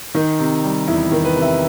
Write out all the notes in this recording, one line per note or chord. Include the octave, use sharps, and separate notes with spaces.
D#3 D#4
C3
G3
E2 E4
D#3
B4
C3
E5